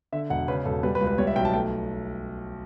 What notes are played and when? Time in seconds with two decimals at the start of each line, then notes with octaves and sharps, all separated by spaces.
0.12 D3 E5
0.30 E1 F#5
0.48 C#3 B4
0.66 E1 A4
0.83 G3 B4
0.95 B4
1.01 C#2
1.07 B4
1.18 G3 C#5
1.27 E5
1.36 B1 G5
1.45 A5
1.54 A3 G5